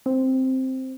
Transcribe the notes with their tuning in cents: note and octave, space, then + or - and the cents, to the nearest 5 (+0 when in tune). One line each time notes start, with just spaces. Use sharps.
C4 +0